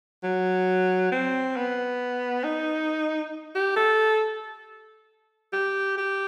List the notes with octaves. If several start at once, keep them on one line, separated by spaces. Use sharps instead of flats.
F#3
C4
B3
D#4
G4
A4
G4
G4